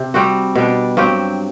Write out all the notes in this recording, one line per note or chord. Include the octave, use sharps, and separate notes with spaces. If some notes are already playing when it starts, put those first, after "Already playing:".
Already playing: C3
G3 C4 F#4
B2 G3 D4
G2 F#3 C4 G4